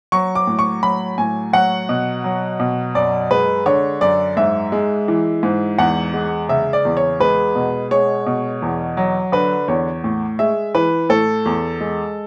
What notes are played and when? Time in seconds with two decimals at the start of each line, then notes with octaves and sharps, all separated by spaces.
0.12 F#3 C#6
0.35 D6
0.47 A2
0.59 C#6
0.82 F#3 B5
1.18 A2 G#5
1.53 F#3 F#5
1.89 B2
2.24 F#3
2.60 B2
2.95 F#2 D5
3.31 G#3 B4
3.66 D3 C#5
4.01 F#2 D5
4.37 G#2 E5
4.72 G#3
5.08 E3
5.43 G#2
5.78 E2 F#5
6.14 G#3
6.49 C#3 E5
6.73 D5
6.85 E2
6.97 C#5
7.20 G#3 B4
7.55 B2
7.91 G#3 C#5
8.26 B2
8.62 E2
8.97 F#3
9.32 D3 B4
9.68 E2 C#5
10.04 A2
10.39 G#3 E5
10.74 E3 B4
11.09 A2 A4
11.46 E2
11.81 G#3